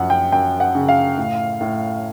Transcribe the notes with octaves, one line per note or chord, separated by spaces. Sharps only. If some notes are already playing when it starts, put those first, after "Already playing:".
Already playing: F#2 F3 F#5
G5
F#2 G5
F#5
C#3
F5
A2
A2